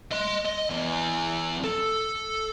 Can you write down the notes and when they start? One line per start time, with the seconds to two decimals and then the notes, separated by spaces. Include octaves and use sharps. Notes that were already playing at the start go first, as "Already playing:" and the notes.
0.12 D#5 C6
0.46 D#5
0.70 E2
1.64 A4